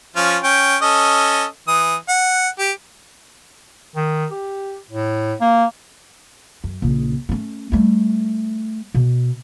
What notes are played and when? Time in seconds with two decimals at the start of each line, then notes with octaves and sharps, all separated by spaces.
0.16 F3 C#4 F4
0.43 C#4 G5
0.82 C#4 A4 D#5
1.68 E3 D#6
2.09 F#5
2.59 G4
3.96 D#3
4.31 G4
4.90 A2
5.41 A#3
6.64 F#2
6.82 A#1 C#3
7.29 A3 C#4
7.72 G3 A3
8.95 B2